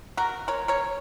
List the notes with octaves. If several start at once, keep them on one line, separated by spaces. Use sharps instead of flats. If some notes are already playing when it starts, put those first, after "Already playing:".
F#4 A#4
A#4 C#5
A#4 C#5